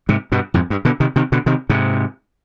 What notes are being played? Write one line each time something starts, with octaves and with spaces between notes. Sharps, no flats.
G#2 C3
G2 B2
F2 G#2
G2
B2 D3
C3 D#3
C3 D#3
B2 D3
C3 D#3
G#2 C3